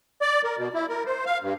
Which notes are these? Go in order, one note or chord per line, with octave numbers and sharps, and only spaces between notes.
D5
A#4
B2
E4
A#4
C5
F5
G2